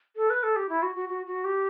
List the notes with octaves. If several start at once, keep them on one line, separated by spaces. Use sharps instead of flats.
A4
B4
A4
G4
E4
F#4
F#4
F#4
F#4
G4